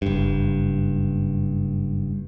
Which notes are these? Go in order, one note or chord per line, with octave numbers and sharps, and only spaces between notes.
F#1 G2